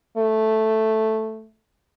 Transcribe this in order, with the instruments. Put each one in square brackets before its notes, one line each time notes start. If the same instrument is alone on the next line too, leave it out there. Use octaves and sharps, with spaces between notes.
[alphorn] A3